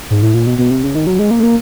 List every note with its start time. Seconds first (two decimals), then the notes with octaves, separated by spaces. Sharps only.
0.10 G#2
0.23 A2
0.34 A#2
0.46 B2
0.58 B2
0.70 C3
0.83 C#3
0.95 D#3
1.07 F#3
1.19 G#3
1.31 A#3
1.40 A3
1.43 A#3